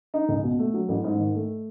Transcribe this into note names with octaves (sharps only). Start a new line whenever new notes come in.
D#4
C#2
B2
A3
F#3
A1
G#2
D#3
A3